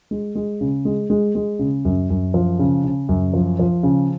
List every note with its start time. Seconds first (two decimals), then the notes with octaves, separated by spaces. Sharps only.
0.11 G#3
0.35 G#3
0.61 C#3
0.85 G#3
1.10 G#3
1.35 G#3
1.59 C#3
1.85 F#2
2.10 F#2
2.34 F3
2.59 C#3
2.84 C#3
3.09 F#2
3.34 F3
3.59 F3
3.83 C#3